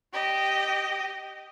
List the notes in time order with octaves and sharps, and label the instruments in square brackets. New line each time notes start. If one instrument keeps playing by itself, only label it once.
[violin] G4 D#5